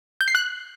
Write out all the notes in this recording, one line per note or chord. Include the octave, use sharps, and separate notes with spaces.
G6
C7
F#6